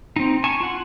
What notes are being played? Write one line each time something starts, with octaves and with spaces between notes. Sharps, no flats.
C4 D#4
G#5 A5 C#6
F4 F#5